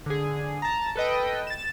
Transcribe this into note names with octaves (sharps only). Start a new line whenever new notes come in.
D3 G#4
A5 A#5
A4 B4 D#5 G5
A6 E7